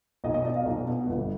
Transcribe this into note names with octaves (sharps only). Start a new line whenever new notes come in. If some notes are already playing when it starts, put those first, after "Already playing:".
B1 D#5
D#5
B2 D5
F5
B1
B2
G1